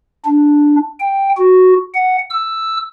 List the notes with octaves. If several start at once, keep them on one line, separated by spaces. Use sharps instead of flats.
D4
G5
F#4
F#5
E6